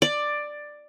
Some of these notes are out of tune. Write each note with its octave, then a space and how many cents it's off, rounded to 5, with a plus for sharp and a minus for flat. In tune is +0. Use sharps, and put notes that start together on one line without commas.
D5 +10